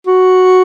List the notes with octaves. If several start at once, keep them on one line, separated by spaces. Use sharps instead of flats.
F#4